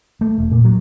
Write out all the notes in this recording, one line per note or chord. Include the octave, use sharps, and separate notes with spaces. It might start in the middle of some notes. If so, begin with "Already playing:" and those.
A3
E1
A#2
F#3